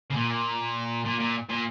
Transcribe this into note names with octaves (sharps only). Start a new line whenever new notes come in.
C#3
A#2
A#2
A#2
A#2